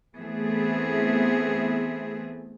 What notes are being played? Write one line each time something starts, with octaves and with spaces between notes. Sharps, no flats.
E3 A3 B3 C4 G#4 E5